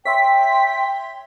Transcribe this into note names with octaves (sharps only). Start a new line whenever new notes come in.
C#5 E5 G5 C6 B6